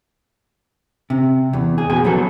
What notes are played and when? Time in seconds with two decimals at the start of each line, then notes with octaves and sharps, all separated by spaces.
1.10 C3
1.53 E2
1.78 G#4
1.90 B2 G#5
2.04 F3 F#3 B3 A4